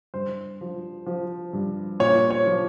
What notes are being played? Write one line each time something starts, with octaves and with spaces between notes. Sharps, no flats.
G2 C5
F3
F3
G2
A#2 C#5
C#5
F3